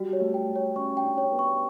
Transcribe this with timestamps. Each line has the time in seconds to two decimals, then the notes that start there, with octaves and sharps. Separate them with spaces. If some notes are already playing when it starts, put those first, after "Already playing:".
Already playing: G3 F#4
0.13 C#5
0.20 A3
0.34 G5
0.56 C#5
0.76 C#4 C#6
0.97 G5
1.04 D4
1.18 C#5
1.32 B3
1.39 C#6